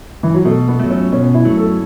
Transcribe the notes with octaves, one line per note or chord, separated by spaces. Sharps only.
E3
F#3
B2 A3
B3
F#3 A3
C#4
B2 C#4
E4
F#3 A3
A4